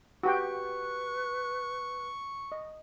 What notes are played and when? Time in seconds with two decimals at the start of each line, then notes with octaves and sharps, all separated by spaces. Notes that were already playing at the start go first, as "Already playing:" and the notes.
0.23 F#4 G4 B4 G5 C#6
2.52 D#5